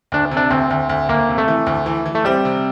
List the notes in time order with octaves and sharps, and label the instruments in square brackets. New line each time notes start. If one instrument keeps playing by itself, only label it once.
[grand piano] D2 [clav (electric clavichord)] D4
[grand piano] C3
[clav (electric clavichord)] D4
[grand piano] D2 [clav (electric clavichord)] C4
[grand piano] D2
D2
[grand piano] D2 [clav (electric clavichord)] A#3
[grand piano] C3
[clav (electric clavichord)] A3
[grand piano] E3
D2
E3
E3
[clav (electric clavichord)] A3
[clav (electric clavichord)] G3 [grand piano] C4
[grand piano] C3